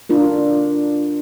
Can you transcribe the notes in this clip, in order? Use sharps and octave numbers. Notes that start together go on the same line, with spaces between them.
D4 F4 A#4